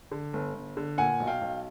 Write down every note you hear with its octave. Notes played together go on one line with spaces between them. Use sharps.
D3
G1
G1
D3
A#2 F#5 G#5
B1
F5 G5
B1